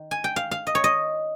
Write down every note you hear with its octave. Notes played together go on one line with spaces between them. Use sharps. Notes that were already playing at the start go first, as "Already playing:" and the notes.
Already playing: D#3
G#5
G5
F5
F5
D#5
C#5
D#5